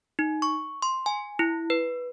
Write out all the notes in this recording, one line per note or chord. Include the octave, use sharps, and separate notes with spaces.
D#4
C#6
C6
G#5
E4
B4